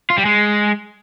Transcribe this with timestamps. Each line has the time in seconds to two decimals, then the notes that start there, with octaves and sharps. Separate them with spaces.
0.10 F4
0.18 G3
0.25 G#3